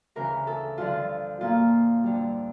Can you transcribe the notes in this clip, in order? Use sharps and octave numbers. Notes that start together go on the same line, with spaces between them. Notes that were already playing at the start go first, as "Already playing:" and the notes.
D2 C#3 E3 A#4
A4
G2 D3 F3 F4
A#2 F3 A#3 F4
F2 D3 G3